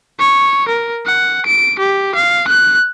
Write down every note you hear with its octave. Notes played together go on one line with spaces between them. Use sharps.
C#5
A#4
F#5
D7
G4
F5
F#6